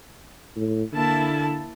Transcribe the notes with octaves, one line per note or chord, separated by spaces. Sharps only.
A2
D3 A#3 E4 A5